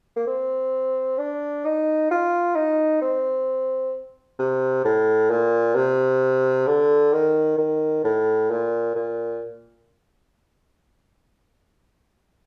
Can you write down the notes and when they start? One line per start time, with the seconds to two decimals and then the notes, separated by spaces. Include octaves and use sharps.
0.16 A#3
0.27 C4
1.18 D4
1.65 D#4
2.11 F4
2.56 D#4
3.01 C4
4.39 C3
4.84 A2
5.30 A#2
5.75 C3
6.67 D3
7.13 D#3
7.58 D#3
8.04 A2
8.50 A#2
8.95 A#2